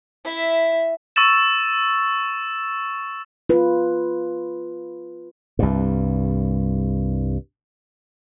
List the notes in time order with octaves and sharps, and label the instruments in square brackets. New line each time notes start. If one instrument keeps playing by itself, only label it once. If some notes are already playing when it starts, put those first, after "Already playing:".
[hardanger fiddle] E4 E5
[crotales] C#6 E6 A6 E7
[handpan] F4 B4
[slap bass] C2 G2